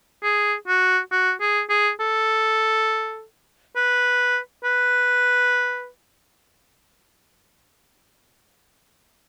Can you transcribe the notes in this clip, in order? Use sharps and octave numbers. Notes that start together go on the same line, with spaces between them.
G#4
F#4
F#4
G#4
G#4
A4
B4
B4